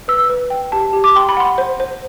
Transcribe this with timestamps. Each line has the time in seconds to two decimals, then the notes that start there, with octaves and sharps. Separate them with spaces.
0.08 B4 E6
0.29 B4
0.50 G5
0.72 G4 A5
0.93 G4
1.04 D6
1.16 G5 C6
1.29 B5
1.37 F#5 C6
1.58 C5
1.80 C5